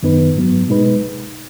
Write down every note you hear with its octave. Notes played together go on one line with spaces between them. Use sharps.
F#2 D#3 B3 D#4 B4
G#2 F#3 B3
B2 G#3 D#4 B4